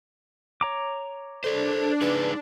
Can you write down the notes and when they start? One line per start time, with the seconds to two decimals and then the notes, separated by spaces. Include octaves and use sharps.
0.61 C#5 A#5 D6
1.44 D4 A4 C5 D5
2.01 D#4 G#4 B4 D5